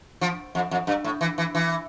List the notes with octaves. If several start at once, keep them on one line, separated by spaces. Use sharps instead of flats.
F3
F2
F2
G2
A2
E3
E3
E3